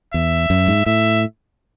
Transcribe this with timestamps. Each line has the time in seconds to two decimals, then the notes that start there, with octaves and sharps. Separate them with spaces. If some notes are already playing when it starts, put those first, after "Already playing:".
0.14 E2 E5
0.50 F#2
0.68 G#2
0.86 A2 E5